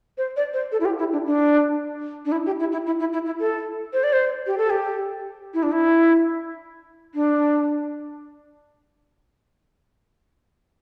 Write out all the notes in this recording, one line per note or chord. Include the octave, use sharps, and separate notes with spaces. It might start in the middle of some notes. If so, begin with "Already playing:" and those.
C5
D5
C5
A4
E4
G4
E4
D4
D4
D4
E4
G4
E4
E4
E4
E4
E4
E4
A4
C5
D5
C5
G4
A4
G4
E4
D4
E4
D4